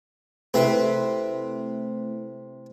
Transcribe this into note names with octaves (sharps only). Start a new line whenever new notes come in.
C3 A3 C4 E4 B4